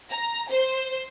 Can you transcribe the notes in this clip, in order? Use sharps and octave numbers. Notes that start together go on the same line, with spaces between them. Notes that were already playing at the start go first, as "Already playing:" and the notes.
A#5
C5